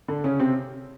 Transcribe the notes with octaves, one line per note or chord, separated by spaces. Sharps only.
D3 D4
C#3 C#4
C3 C4